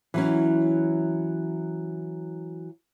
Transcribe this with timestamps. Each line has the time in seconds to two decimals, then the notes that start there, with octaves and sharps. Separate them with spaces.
0.14 E3 F#3 C#4